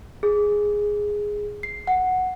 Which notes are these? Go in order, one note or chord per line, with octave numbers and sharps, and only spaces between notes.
G#4
C7
F#5